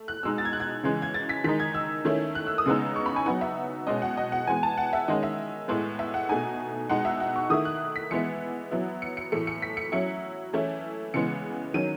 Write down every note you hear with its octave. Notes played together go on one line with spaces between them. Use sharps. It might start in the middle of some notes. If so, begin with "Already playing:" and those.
Already playing: A3
F#6
B2 G#3 D#4 E6
A6
G#6
F#6
G#6
C#3 E3 G#3
G#6
A6
B6
D#3 G#3 D#4 B6
G#6
E6
D#3 A3 C#4 E4
F#6
E6
D#6
C#3 G#3 B3 D#4 E6
C#6
B5
G#5
F#3 B3 D#4 F#5
E5
B2 G#3 C#4 D#5
F#5
D#5
F#5
E3 G#3 B3 G#5
A5
F#5
E5
D#3 G#3 C#4 D#5
E5
A2 G#3 B3
E5
F#5
B2 A3 D#4 G#5
B2 G#3 D#4 F#5
E5
F#5
C#6
D#3 A3 E4 D#6
F#6
B6
E3 G#3 B3 E4 C#7
F#3 B3 E4
C#7
C#7
A2 E3 A3 C#7
C#7
B6
C#7
F#3 C#4 E4 C#7
E3 A3 C#4 E4
C#3 E3 G#3 B3 C#7
D#3 F#3 C#4 D#7